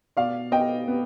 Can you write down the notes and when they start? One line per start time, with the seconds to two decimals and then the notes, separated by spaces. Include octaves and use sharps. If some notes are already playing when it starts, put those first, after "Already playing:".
0.17 B2 D5 F5
0.51 B3 D#5 G5
0.88 B3